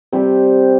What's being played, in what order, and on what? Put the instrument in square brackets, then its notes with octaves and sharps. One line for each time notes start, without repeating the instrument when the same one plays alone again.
[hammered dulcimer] C3 G3 C4 G4